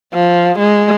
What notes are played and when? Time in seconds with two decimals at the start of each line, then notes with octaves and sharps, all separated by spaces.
0.14 F3
0.59 G#3